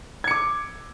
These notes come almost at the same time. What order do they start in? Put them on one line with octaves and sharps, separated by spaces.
G#6 C#7 D6